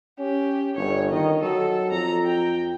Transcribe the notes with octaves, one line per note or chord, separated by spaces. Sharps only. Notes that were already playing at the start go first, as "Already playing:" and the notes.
C#4 G4
G1 C#5
D#3 D#5
F#3 A4
F2 A#5
G5